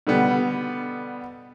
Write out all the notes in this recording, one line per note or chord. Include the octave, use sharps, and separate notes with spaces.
B2 D3 G3 B3